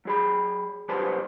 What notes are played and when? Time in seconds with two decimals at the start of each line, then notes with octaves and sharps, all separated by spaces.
0.05 F#3 G#4 B5
0.89 C2 F#3 G4 B4 C5 A5